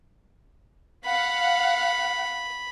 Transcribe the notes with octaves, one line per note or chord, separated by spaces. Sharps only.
F5 F#5 B5